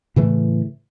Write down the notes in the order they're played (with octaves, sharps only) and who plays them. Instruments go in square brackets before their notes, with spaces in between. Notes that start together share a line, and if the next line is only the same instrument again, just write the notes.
[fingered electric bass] A2 C#3 E3 A3